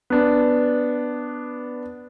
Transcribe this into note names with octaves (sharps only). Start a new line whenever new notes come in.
B3 D4